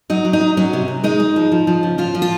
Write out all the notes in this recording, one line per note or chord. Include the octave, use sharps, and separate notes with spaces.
F#3 D#4
F#3
D#4
F#3
F#3 C#4
C3
C3
G#3 D#4
G#3
F3
F3
F3
C#3
F3 F4
F3
F4